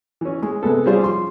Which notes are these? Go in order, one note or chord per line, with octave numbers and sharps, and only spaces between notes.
E3 C#4
G#3
C3 G#3 B3 A4
G3 C#4 F4 G#4 C5 D5
F3 C6